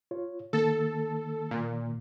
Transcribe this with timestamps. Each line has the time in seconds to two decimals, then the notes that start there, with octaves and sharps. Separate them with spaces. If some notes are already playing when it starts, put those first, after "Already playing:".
0.11 F4 C#5
0.53 D#3 A#3 A4 A6
1.51 A#2